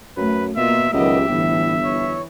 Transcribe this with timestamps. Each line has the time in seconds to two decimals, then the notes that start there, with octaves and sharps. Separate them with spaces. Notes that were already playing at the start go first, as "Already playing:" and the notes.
0.17 F#2 A3 B4
0.57 B2 A#3 F4 A#4 E5
0.93 C#2 D#3 F#3 B3 G4 D#5 E5
1.28 G1 A2 E3
1.83 E3 C#5